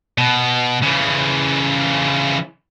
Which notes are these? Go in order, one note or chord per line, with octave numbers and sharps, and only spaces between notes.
B2
C#3 E3